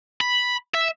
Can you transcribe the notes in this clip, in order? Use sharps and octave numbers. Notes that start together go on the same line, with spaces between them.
B5
E5